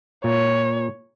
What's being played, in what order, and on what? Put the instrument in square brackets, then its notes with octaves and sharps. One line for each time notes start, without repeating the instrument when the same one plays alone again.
[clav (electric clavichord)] A#2 [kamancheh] C#5